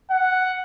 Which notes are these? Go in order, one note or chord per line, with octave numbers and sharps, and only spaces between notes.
F#5